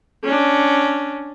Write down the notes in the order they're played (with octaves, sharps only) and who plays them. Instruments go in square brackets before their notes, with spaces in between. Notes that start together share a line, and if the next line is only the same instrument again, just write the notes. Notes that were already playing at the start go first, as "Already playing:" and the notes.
[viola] C#4 D4